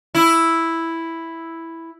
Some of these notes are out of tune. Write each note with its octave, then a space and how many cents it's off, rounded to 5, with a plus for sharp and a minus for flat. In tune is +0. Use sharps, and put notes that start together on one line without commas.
E4 +0